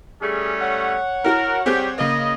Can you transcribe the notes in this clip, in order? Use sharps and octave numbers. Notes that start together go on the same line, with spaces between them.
G3 A3 C#4 G#4
C#5 F#5
E4 F#4 A#4
G3 C4 G4 G#4 G6
C#3 A#3 D#5